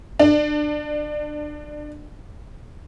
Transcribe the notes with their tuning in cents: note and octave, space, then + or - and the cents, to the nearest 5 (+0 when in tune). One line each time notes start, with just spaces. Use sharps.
D4 +25